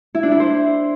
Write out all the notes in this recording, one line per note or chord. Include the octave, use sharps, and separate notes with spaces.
E4
D4
E4
C5